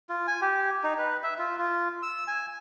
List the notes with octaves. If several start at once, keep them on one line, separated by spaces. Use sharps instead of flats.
F4
G#5
G4
D#4
B4
E5
F4
F4
E6
G#5